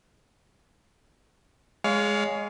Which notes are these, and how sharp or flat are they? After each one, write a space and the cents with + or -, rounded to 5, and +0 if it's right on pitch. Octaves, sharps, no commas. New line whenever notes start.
G#3 +0 C#5 +30 F5 +0